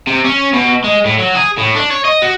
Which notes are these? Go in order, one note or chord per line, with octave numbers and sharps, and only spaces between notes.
C3
C#4
B2
G#3
A2
F#3
G#4
A2
D4
C#5
D#5
F#4